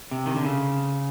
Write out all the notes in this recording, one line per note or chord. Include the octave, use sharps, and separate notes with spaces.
C3
D#3
D3
C#3